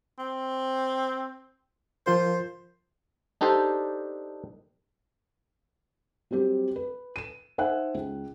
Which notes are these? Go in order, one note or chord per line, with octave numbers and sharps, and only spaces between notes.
C4
F3 F4 A#4 C5
D4 D#4 G4 A4 C5 D5
F#3 G3 C4 G4
B4
D#7 E7
D#4 C5 E5 F#5 G#5 F#6
C#2